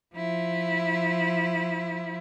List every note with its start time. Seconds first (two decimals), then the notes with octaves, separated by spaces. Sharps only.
0.15 F3 E4